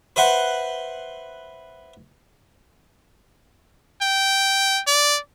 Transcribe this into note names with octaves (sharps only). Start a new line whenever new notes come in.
B4 C5 E5 F#5 C6
G5
D5